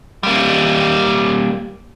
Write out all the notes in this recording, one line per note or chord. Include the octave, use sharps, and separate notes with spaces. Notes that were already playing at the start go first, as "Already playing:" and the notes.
G3 A#3